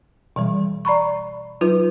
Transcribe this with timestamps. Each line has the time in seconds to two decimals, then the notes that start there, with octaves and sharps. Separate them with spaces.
0.36 B2 E3 G3
0.85 D5 A#5 B5 C#6
1.61 F#3 D#4 F4 B4